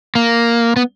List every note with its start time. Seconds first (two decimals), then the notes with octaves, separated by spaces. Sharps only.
0.15 A#3
0.76 B3